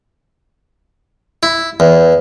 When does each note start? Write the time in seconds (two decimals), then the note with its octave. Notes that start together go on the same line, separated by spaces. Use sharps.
1.43 E4
1.80 E2